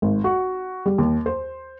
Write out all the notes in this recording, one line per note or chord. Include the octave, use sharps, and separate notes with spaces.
G#1
F#4
G3
D#2
C5